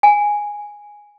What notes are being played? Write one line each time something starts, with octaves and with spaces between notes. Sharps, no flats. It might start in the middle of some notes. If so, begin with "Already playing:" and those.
G#5